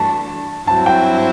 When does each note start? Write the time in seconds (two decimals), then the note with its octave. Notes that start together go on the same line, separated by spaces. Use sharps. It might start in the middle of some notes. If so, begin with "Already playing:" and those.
Already playing: G2 E3 A3 D4 F#4 A5
0.67 G2 F#3 C4 E4 A5
0.86 G5